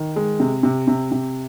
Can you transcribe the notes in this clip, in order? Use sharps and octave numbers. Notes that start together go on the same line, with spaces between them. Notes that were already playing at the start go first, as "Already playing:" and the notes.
Already playing: D#3
G#3
C3
C3
C3
C3